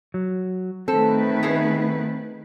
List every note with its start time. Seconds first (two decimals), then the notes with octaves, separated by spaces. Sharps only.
0.14 F#3
0.88 D#3 A3 C4 A4 B4
1.43 B3 E4 G#4